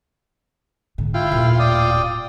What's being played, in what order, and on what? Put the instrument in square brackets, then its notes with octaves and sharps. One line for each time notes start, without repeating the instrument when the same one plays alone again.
[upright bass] G#2 D3
[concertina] E4 G5 [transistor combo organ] F4
[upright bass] D#1 A2
[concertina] D5 G5 D#6